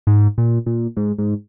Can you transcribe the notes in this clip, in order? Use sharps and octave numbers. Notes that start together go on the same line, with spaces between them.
G#2
A#2
A#2
G#2
G#2